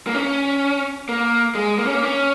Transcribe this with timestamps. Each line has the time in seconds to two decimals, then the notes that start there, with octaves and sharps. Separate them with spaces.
0.07 A#3
0.14 C#4
1.09 A#3
1.55 G#3
1.78 A#3
1.86 C#4
1.94 A#3
2.03 C#4